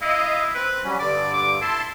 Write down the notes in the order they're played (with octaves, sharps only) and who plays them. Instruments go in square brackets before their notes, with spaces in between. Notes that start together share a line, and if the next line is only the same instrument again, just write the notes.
[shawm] E4 [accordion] D#5 F5
[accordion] C4 [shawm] B4
[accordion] F#3 G3 C#4
[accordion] G2 D3 [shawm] D5
[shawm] D6
[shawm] E4 [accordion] A5 C6